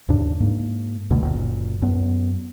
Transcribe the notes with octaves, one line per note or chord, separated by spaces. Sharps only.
D#2 G#2 C#3 D4
G#2 A#3
D2 B2 D3 A3
F#1 A#2
F#2 B3